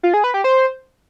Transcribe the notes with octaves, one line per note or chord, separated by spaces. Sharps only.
F4
G#4
B4
G4
C5